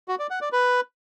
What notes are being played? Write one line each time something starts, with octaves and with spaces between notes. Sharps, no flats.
F#4
D5
F#5
D5
B4